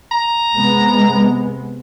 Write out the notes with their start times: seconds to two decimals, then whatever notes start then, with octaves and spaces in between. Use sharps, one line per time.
0.12 A#5
0.56 C3 G#3 B3